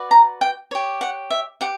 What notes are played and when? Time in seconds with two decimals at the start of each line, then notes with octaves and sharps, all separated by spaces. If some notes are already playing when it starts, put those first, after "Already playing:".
Already playing: F#4 B4 D5
0.11 A#5
0.41 G5
0.71 G4 C#5
1.01 F#5
1.30 E5
1.61 G4 F#5